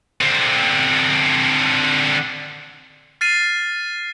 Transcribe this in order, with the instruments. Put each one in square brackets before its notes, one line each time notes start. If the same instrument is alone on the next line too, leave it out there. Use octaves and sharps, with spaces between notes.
[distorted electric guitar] D3 C4
[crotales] F6 A6 C7 D#7